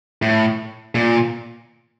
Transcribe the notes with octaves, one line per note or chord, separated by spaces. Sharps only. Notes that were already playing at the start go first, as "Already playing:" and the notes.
A2
A#2